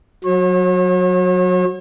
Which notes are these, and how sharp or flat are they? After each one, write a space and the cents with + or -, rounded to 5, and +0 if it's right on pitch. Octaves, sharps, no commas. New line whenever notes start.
F#3 -15 C#5 -40